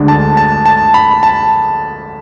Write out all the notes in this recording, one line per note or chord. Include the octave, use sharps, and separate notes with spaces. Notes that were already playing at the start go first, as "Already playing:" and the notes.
Already playing: D2 D3 G#3 D4
A5
A5
A5
B5
A5